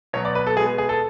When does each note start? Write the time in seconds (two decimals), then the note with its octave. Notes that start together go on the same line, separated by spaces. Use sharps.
0.13 B2 F#3 B3 C#5
0.25 D5
0.35 B4
0.47 A4
0.56 B2 G#3 B3 G#4
0.78 G#4
0.89 A4